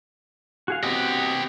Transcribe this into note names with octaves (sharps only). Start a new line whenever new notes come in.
F#4 G#4 F5
B3 C4 F#4 G4 D#5